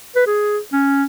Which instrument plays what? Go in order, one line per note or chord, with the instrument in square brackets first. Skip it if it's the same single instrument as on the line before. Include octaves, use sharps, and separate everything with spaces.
[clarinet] B4
G#4
C#4